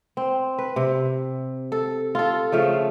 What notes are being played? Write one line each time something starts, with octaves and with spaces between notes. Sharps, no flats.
C4
B4
C3
A4
F4 A4
C#3 F3 A3 F5